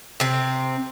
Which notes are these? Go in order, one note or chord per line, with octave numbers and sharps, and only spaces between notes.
C3 C4